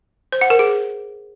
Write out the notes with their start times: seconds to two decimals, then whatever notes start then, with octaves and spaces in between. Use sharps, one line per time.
0.32 C5
0.41 F#5
0.50 A#4
0.59 G#4